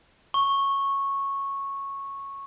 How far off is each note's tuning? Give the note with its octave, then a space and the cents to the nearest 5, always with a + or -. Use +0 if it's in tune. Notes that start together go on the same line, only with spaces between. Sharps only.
C#6 -10